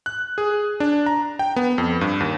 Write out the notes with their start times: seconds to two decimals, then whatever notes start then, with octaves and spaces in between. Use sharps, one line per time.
0.06 F#6
0.38 G#4
0.80 D4
1.06 A#5
1.39 G5
1.56 B3
1.78 F2
2.01 G2
2.20 D#2